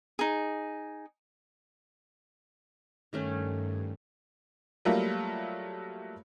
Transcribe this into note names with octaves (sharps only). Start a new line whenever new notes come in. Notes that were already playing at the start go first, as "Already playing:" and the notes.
D#4 G#4
G2 D#3 A3 C#4
F#3 G3 A3 A#3 F4